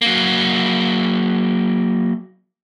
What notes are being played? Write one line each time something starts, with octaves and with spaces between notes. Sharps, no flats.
F#3 A#3